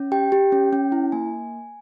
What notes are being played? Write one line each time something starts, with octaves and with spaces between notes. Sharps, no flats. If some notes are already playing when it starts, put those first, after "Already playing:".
Already playing: C#4
G4 G5
G4
C#4
C#4
E4
A#3 G#5